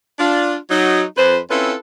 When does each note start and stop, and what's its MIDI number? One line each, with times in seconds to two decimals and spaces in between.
0.19 0.56 62
0.19 0.56 65
0.71 1.04 54
0.71 1.04 63
1.17 1.38 41
1.17 1.38 71
1.17 1.38 72
1.51 1.74 60
1.51 1.74 61
1.51 1.74 64
1.51 1.74 65
1.51 1.74 69
1.51 1.74 71